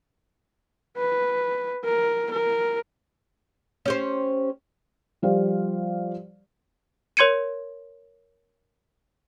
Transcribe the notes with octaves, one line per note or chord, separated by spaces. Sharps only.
B4
A#4
A#4
C#4 G4 C5
F3 G3 G4 C5 D5 F5
A#4 C#5 C6 G#6 C#7 D#7